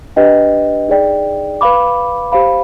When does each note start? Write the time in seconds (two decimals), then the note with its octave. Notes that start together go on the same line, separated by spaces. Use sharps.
0.16 D4 G4 B4 D#5 G5
0.88 D#4 G#4 D5 G5
1.61 B4 F5 B5 D6
2.32 G4 C5 F5 B5